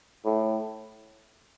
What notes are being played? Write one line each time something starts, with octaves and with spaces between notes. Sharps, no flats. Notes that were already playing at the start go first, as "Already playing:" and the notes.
A2